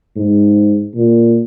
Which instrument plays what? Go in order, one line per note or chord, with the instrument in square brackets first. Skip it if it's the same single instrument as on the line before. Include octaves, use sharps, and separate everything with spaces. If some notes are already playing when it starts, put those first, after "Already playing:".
[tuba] G#2
A#2